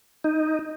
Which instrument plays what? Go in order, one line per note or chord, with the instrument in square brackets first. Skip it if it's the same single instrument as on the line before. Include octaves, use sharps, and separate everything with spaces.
[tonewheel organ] D#4